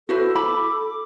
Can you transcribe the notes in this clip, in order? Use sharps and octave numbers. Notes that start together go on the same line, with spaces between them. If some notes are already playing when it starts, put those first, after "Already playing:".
E4 F#4 A4 B4 C5
B5 D6